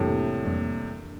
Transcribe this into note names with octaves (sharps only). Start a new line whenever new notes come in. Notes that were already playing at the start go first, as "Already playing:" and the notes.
Already playing: F2 A2 C3 E3 G3 A#3 D4
F2 E3 G3 A#3 D4